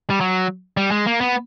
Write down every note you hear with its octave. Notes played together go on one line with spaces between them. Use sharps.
G3
F#3
G3
G#3
A#3
B3